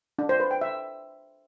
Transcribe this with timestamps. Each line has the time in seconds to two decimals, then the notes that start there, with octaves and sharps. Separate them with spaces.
0.19 D4
0.29 C5
0.40 B4
0.51 G5
0.61 E5